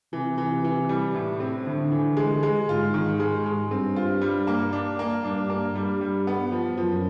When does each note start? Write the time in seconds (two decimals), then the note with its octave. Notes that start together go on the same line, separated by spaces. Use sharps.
0.13 C3 E3
0.38 E3
0.64 E3
0.89 G3
1.14 A2
1.40 C4
1.67 A2 D3
1.91 E3
2.17 G#3
2.43 G#3
2.69 G#2 F4
2.94 D#3
3.20 G#3
3.46 G#3
3.70 G2 C4
3.96 F4
4.21 G3
4.47 A#3
4.73 D4
4.99 A#3
5.24 G2 D4
5.50 A#3
5.75 G2 G3
6.01 G3
6.27 B3
6.52 F3
6.77 F#2 F3